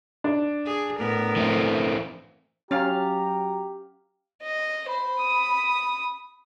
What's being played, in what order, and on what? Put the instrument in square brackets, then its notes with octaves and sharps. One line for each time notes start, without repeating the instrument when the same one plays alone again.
[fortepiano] D4
[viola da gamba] G#4
A2 B3 A#4
[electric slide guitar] E3 A3 C4
[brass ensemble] F#3 F#4 A#5 [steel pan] C#4 [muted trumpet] G4 [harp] F5 F6 A6
[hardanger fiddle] D#5
[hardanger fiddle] C5 [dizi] B5
[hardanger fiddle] D#6